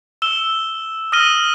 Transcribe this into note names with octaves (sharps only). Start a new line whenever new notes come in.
E6 E7 G7
D#6 F6 A#6 D#7 G7